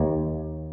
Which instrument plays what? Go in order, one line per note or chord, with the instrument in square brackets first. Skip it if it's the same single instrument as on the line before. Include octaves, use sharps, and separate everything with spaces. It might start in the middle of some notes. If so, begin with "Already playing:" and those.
Already playing: [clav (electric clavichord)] D#2